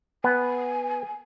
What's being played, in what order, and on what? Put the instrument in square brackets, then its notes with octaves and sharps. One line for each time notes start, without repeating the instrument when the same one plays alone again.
[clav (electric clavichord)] B3 [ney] G#5